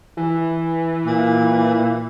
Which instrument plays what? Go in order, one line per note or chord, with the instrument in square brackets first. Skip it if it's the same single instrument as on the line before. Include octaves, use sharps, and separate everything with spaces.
[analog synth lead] E3
[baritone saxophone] A#2